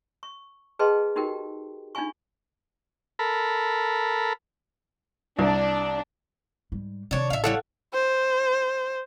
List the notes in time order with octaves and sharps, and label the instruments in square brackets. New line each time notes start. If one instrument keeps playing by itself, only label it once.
[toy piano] C#6
G#4 B4 D#5 G5 A5 C6
D#4 F#4 G4 A#4 G5
D4 D#4 F4 F5 G#5 C#6
[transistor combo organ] A4 A#4 B5
[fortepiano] C2 [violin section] D4
[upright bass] G#2 G3
[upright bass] C3 D#3 [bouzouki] D4 C#5
[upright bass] A1 [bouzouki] E5 F5
[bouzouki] G3 E4 C#5 [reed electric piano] A4 F5 F#5
[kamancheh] C5